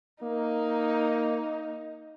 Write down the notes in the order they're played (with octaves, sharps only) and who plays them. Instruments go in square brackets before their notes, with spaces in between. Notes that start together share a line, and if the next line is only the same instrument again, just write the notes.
[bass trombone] A#3 [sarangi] D#4